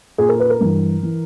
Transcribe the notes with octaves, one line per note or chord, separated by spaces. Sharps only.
A#2 G#4
A#4
B4
A#4
G2 E3
E3